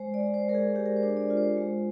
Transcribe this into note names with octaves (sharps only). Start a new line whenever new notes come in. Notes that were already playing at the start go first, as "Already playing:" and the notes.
Already playing: G#3 C5
D5
G#3
C5
G#3 A#4
G#4
G#3 G4
A#4
C5
D4
D5
F4
C5
G#3